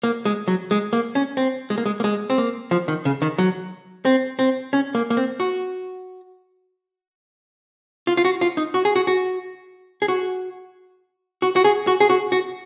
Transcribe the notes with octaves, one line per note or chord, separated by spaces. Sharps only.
A#3
G#3
F#3
G#3
A#3
C#4
C4
G#3
A#3
G#3
A#3
G#3
C4
A#3
F3
D#3
C#3
D#3
F#3
C4
C4
C#4
A#3
A#3
C4
F#4
F4
F4
F#4
F4
D#4
F#4
G#4
F#4
F#4
G#4
F#4
F#4
F#4
G#4
F#4
G#4
F#4
F#4